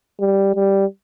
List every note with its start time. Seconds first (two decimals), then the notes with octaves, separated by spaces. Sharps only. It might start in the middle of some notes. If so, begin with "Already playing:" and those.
0.20 G3
0.55 G3